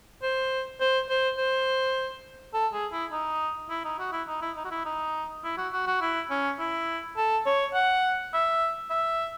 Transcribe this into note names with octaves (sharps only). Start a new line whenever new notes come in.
C5
C5
C5
C5
A4
G#4
E4
D#4
E4
D#4
F#4
E4
D#4
E4
D#4
F#4
E4
D#4
E4
F#4
F#4
F#4
E4
C#4
E4
A4
C#5
F#5
E5
E5